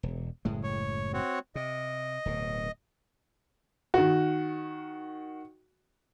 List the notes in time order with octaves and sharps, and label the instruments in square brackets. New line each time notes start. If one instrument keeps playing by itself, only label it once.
[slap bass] E1
F#1 A2 G#3
[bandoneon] C#5
C4 F#4 C#5
[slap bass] C3 [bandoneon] D#5
[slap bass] D1 B2
[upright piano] D#3 F#4